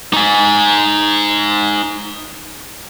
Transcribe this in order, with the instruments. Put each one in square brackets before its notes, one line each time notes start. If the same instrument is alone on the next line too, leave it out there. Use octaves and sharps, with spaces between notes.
[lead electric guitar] D#4 G#5